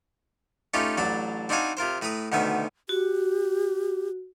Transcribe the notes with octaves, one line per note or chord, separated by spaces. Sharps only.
A3 C#4 D#4 F4 G4 B4
A1 F#3 D4 A5 B5
C4 D4 D#4 F#4 F5 G#5
C3 F4 A#4 C5
A2 B4 A#5 B5 D#6
D2 B2 D#3 B3 E5
F#4 G4